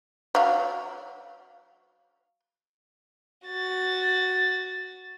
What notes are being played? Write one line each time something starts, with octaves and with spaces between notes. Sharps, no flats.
F#3 F5
F#4 A6